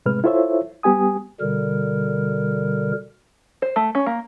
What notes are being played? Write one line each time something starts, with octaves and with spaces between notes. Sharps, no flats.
A2 C3 G#3 B4 F6
E4 F4 A4 C5 C#5 E5
G3 B3 G4 G#5 D#6
B2 D3 G3 A#4
C5
A3
C#4
A#3